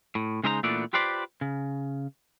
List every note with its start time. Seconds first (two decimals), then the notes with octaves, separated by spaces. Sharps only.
0.15 A2
0.44 C#3 G#3 D#4 C5 D#5 A#5
0.63 A#2 E3 A3 B3 D4 D5
0.93 F4 G4 B4 C5 D5
1.41 C#3